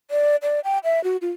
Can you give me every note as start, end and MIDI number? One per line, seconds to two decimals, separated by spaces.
0.11 0.36 74
0.43 0.60 74
0.64 0.78 79
0.84 1.02 76
1.04 1.17 66
1.22 1.31 65